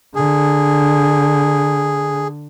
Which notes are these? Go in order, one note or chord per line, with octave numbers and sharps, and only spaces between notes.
D3 G#4